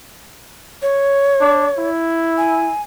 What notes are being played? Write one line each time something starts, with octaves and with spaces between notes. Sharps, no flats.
C#5
D4
E4
G#5